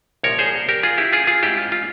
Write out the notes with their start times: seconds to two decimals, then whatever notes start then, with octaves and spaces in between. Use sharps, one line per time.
0.23 C2 A#2 F3 A#4 C#5
0.39 G#4 C5
0.69 G4 A#4
0.83 F4 G#4
0.97 E4 G4
1.13 F4 G#4
1.27 F4 G#4
1.43 G#2 G3 C4 E4 G4
1.58 F4
1.72 F4